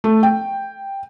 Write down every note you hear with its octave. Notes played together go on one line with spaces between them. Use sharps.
A3
G5